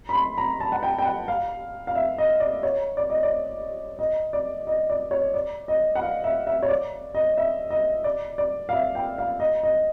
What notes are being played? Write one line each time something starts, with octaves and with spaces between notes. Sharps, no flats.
B5
C6
A#5
A5
F#5
G5
G5
F#5
F5
F5
E5
D#5
D5
C#5
D5
D#5
D5
D#5
D5
D#5
D5
C#5
D5
D#5
F#5
F5
E5
E5
C#5
D5
D#5
E5
D#5
D5
D5
F5
E5
G5
F5
D#5
D#5